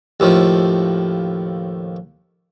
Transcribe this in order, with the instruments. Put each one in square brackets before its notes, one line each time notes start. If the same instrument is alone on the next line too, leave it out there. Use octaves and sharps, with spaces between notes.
[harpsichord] D#2 A2 F3